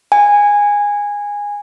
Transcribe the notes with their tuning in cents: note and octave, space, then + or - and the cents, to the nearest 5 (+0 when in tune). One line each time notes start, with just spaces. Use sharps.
G#5 -15